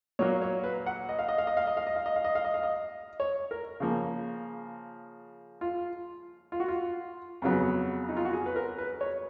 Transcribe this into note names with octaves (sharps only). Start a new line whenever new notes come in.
A#2 F#3 A#3 C#5
C#5
B4
F#5
D#5
F5
D#5
F5
D#5
F5
D#5
F5
D#5
F5
D#5
F5
D#5
F5
D#5
F5
D#5
C#5
A#4
C#3 F3 A#3
F4
F4
F#4
F4
F2 C#3 F#3 B3
D#4
F4
F#4
G#4
B4
A#4
B4
C#5